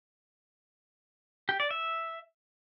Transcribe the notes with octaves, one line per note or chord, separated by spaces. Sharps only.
G4
D5
E5